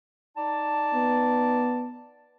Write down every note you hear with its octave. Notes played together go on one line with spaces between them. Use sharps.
D#4 D5 A5
B3